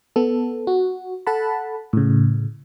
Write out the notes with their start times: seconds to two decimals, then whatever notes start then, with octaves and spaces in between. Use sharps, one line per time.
0.16 B3 A4
0.67 F#4
1.27 A4 F#5 A5 B5
1.93 A2 C#3